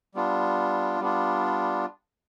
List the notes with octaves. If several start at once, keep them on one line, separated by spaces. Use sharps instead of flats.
G3 B3 D4 F4
G3 B3 D4 F4